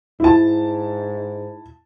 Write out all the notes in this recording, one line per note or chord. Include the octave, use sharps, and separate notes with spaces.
G#2 E4 A5